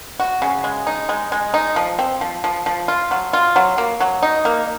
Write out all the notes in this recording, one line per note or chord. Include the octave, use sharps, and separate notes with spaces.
F#4
C#3
G#3
D#4
G#3
G#3
D#4
F3
C4
F3
F3
F3
F4
F#3
F4
F#3
A#3
F#3
D#4
A#3